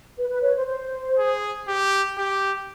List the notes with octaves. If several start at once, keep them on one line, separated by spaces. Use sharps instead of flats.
B4
B4
B4 C#5
C5
C5
G#4
G4
G4